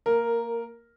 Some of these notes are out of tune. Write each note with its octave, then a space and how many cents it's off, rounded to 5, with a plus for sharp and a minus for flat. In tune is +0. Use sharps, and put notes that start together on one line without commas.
A#3 -15 A#4 +0